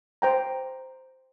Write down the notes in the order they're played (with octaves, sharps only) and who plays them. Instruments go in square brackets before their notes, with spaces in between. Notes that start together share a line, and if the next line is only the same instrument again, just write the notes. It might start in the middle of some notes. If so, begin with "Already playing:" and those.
[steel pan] C5 G5 A#5